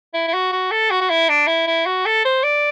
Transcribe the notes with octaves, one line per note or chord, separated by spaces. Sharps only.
E4
E4
F#4
F#4
A4
F#4
F#4
E4
D4
E4
E4
F#4
A4
C5
D5